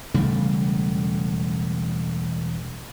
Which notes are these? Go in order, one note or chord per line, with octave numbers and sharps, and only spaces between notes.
E1 C#3 G3 A3